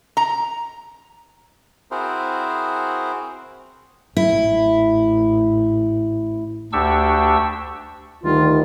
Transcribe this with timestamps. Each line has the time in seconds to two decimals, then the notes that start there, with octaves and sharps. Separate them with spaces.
0.17 A#5
1.91 C4 E4 F#4 G#4 A#4 C5
4.17 A1 E4
6.73 D2 D4 G4 C#6 E6
8.24 D2 D#3 G3 F4